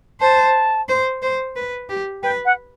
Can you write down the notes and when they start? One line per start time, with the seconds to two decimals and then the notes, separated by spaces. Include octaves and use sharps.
0.21 C5 A5
0.88 C5
1.22 C5
1.56 B4
1.89 G4
2.23 B4 G5
2.45 F#5